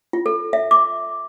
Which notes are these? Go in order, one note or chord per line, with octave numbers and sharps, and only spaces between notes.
F4
A4
E5
D6